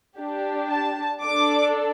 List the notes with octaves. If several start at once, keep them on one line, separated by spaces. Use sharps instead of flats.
D4 G4
A5
D4 A4 D6